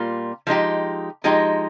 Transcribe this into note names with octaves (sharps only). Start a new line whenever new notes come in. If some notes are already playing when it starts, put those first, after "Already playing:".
Already playing: A#2 G3 A#3 F4
F3 G#3 D#4 G4
F3 G#3 D#4 G4